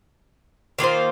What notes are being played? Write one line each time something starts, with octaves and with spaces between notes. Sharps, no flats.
D#3 A#3 F4 C5